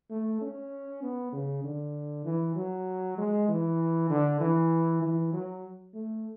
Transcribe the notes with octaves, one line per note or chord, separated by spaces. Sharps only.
A3
C#4
B3
C#3
D3
E3
F#3
G#3
E3
D3
E3
E3
F#3
A3